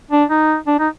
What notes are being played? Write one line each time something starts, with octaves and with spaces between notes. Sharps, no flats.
D4
D#4
D4
D#4